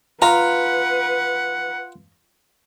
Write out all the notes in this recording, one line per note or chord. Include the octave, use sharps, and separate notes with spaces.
F4 B4 F#5 A#5